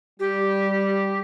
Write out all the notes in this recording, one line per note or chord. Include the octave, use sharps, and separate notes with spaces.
G3 G4